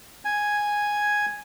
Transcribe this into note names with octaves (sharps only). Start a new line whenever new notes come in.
G#5